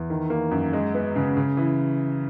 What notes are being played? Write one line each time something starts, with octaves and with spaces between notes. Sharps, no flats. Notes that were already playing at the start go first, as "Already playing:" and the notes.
Already playing: E2
D#3
A#3
F#2
G#3
B3
C#3
C#3
E3